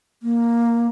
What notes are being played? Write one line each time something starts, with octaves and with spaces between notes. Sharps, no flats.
A#3